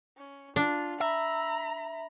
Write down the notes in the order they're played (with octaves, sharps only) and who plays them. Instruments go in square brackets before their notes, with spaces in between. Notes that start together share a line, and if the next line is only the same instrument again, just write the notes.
[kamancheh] C#4
[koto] D4 [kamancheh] F4
[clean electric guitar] E5 [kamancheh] A#5 B5